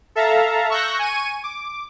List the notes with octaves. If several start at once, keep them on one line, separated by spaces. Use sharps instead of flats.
A4 E5 F5 A5 A#5
C#6 E6 F#6 G6 A#6
G#5 C#6 D#7
D6